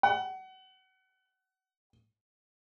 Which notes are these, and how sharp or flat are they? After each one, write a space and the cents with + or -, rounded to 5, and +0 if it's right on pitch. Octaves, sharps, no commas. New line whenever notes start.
F#5 +30